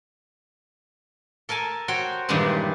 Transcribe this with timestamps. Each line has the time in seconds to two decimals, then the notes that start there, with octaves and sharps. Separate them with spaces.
1.49 A4 A#4 G#5 A5
1.88 F#4 C5 C#5 G5
2.29 G2 A#2 D#3 E3 G3 G#3